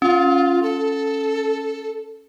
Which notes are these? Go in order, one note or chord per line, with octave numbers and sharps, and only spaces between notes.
C#4 F4
A4